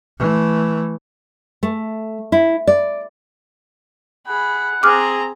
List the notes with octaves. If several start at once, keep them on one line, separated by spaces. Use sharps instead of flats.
E3 A3
A3
E4
D5
G#4 F#5 B5
C4 G#4 A#5 D6 F6